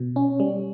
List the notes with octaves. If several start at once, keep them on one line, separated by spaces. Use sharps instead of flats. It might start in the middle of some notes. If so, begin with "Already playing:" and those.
Already playing: B2
C#4
G3